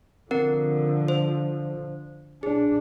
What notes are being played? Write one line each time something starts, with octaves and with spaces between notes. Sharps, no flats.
D3 F3 C4 A#4 F#5
C5
D4 G#4